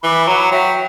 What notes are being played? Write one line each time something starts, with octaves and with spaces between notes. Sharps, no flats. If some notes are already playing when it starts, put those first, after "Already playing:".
E3 B5 D6
F#3 F#5 A#5
B5
A#5
F#3 E5 G5